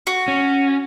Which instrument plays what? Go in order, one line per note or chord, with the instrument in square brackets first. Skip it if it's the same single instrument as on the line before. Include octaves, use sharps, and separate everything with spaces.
[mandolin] F#4
[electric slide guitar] C#4